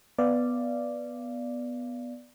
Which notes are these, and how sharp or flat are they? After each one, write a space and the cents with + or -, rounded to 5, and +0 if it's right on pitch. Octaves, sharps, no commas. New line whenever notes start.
B3 +0 D5 +0 F5 -25